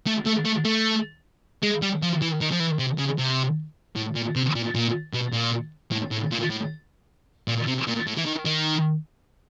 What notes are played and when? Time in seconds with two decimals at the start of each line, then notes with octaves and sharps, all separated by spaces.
0.07 A3
0.26 A3
0.45 A3
0.65 A3
1.63 G#3
1.82 G3
2.02 F3
2.22 E3
2.41 D#3
2.51 F3
2.60 E3
2.79 C3
2.99 C#3
3.19 C3
3.96 A2
4.16 A#2
4.36 C3
4.55 A#2
4.75 A#2
5.14 B2
5.33 A#2
5.91 A2
6.11 A2
6.31 A#2
6.50 A2
7.48 A#2
7.67 C3
7.87 A#2
8.07 A2
8.17 E3
8.25 D#3
8.45 D#3